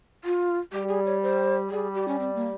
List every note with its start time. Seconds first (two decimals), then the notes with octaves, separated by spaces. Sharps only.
0.24 F4
0.72 G3 G4
0.88 G#4
1.06 C#5
1.22 C5
1.70 G3 G#4
1.94 G4
2.08 C#4
2.19 C4
2.35 A#3